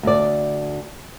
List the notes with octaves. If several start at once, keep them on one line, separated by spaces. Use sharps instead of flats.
D2 D5